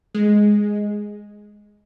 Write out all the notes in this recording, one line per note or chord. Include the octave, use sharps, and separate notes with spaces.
G#3